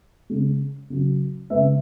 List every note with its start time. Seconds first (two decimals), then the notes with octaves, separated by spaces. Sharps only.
0.30 C#3 G#3
0.90 C#3 F#3
1.50 G#3 B4 E5
1.55 C#3